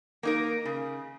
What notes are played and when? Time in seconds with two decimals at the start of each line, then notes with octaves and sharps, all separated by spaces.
0.23 A#3 D#4 A#4
0.65 C#3